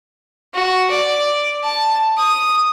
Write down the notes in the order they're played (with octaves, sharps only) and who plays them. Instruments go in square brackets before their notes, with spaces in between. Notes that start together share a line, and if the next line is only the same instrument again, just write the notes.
[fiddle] F#4
D5
A5
D#6